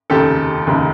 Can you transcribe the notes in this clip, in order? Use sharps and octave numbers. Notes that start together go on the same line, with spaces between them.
F1 D#2 C#3 G4 A4
F1 D#2 C#3